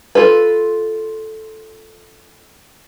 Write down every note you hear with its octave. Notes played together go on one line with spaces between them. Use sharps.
F4 A4 B4